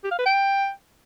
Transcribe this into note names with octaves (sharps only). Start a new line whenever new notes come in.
G4
F5
B4
G5